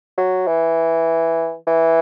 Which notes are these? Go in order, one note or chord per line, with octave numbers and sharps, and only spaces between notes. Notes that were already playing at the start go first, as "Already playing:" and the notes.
F#3
E3
E3